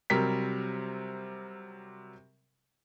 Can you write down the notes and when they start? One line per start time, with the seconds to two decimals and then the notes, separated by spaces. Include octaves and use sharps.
0.10 C3 F#3 G3 C4 A#4 B6